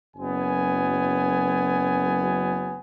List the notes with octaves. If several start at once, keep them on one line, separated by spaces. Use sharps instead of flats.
F#1 F#2 B3 G#5